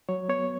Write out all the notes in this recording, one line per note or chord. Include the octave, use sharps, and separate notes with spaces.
F#3 C#5
B3 C#5